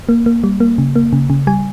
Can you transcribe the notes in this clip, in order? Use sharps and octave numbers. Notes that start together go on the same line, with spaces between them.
A#3
A#3
G3
A#3
C#3
A#3
C#3
C#3
G3 G#5